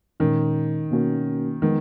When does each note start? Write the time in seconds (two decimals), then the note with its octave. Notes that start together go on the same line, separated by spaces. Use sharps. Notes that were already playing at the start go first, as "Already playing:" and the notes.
0.20 A#2 D#3 G#3 C#4
0.90 B2 A#3 C#4 F#4 A#4
1.62 D#3 F3 G#3 B3 D#4